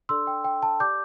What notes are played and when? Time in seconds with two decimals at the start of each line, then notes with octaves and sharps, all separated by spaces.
0.09 D4 A4 D5 C6 E6
0.27 G5
0.44 G5
0.62 A5
0.80 G4 D5 D6 G6